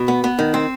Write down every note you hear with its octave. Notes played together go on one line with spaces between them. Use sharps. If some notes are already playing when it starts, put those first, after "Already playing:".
Already playing: B2
B3
B3
D#3
C4